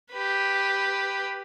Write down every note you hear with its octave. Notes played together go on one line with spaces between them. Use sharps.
G4 B4